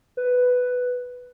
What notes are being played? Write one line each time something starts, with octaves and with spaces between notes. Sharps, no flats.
B4